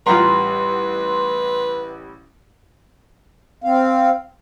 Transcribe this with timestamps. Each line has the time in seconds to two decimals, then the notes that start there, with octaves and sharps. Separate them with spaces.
0.06 A1 G3 F4 G4 B4 F#5 A#5 C6
3.64 C4 F5